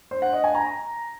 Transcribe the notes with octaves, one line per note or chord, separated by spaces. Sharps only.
C5
F#5
D#5
G#5
A#5